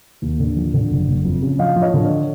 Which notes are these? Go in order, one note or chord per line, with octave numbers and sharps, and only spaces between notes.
D#2
D3
F3
D3
F#1
F#1
F2
C#3
F3 D#5 F5
F3
C#5 D#5
D3
C#5